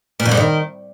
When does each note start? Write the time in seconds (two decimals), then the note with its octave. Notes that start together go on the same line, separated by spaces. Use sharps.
0.20 A#2
0.25 F2
0.31 G2
0.37 D#3